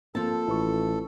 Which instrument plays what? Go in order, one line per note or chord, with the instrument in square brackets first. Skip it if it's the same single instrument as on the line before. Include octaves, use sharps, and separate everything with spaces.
[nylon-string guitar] F3 A5 [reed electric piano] A#3 C4 [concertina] A4
[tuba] A1 [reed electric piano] E4 B4 C#6